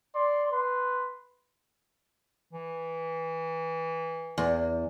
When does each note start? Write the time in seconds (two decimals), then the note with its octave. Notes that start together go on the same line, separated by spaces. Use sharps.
0.15 D5 C6
0.52 B4 C6
2.53 E3
4.38 E2